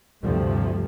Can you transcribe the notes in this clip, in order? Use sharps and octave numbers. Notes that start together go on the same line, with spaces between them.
D2 G2 C3 F3 G3 A3